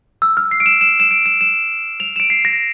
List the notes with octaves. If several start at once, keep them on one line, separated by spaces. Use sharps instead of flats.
E6
F6
C7
D7
E7
E7
E7
D7
E7
E7
F7
E7
D7
C7
A#6